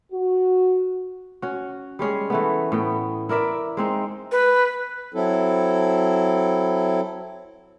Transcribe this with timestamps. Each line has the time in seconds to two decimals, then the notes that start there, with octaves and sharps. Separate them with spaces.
0.13 F#4
1.42 C#4 F#4
1.99 G3 G#3 C#4 G#4
2.30 E3 A3 B3
2.72 A2 B3 G5
3.29 E4 A#4 D5 E5
3.77 G#3 C4 D#4
4.31 B4
5.14 F#3 C4 E4 A4